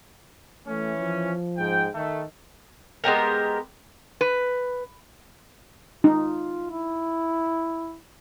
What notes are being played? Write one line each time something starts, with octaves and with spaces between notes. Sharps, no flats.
E3 A3 C#4
F3
G#2 G5
D#3 A3
G#3 B3 G4 A#4
B4
D#4 F4
E4